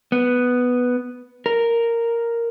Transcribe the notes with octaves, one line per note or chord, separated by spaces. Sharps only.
B3
A#4